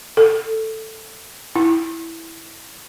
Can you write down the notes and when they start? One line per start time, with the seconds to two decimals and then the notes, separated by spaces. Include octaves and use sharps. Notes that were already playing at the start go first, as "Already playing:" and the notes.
0.17 A4
1.55 E4